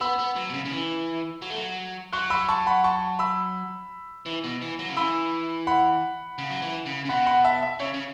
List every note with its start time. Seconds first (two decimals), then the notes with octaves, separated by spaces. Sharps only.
0.01 B3 B5 E6
0.19 B3
0.36 F#3
0.50 B2
0.54 C#3
0.65 C#3
0.72 E3
1.42 F#3
1.50 A3
1.56 F#3
2.13 F#3 C#6 F#6
2.30 B5 E6
2.49 A5 C#6
2.66 F#5 B5
2.84 A5 C#6
3.19 B5 E6
4.26 E3
4.44 B2
4.62 E3
4.79 F#3
4.89 C#3
4.97 E3 B5 E6
5.67 F#5 B5
6.38 C#3
6.50 F#3
6.62 E3
6.86 C#3
7.05 C#3
7.09 B2 F#5 B5
7.26 F#5 B5
7.44 E5 A5
7.62 E5
7.80 C#3 C#5
7.94 C#3